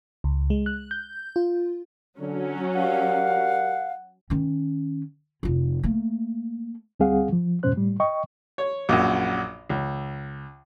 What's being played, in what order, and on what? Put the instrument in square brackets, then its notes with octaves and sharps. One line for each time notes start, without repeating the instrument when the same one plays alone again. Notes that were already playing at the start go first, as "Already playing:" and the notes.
[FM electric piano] C#2
G#3
F#6
G6
F4
[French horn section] D3 [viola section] F#3 C#4
[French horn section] G4 A#4 D5 [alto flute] F5 [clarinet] F#5
[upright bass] D#3 C#4
F1 F4
A3 A#3
[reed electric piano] D2 G3 C4 G#4 F5 F#5
F3
F2 G#2 B2 C#4 C5 F#6
A2 G3
D#5 G5 C#6
[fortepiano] C#5
A#1 F#2
C#2